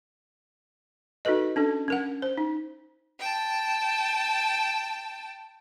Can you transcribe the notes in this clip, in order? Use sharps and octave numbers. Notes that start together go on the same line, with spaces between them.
D#4 F#4 A4 B4 D#5
C#4 D4 A4
C#4 A#4 F#5
C5
D#4
G5 A5